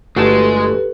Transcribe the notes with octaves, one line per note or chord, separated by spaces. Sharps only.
G1 G#3 A3 F#4 G4 A4 B4 A5